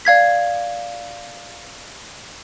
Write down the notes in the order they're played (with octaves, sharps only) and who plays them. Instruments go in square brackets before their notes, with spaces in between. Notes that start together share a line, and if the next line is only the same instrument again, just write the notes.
[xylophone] D5 F5 G#6 B6